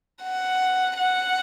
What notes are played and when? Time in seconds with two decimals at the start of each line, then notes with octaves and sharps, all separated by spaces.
0.23 F#5
0.97 F#5